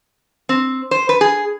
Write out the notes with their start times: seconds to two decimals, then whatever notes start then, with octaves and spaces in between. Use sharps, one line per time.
0.49 C4
0.91 C5
1.09 B4
1.21 G#4